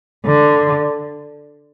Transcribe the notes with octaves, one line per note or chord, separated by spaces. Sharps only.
D3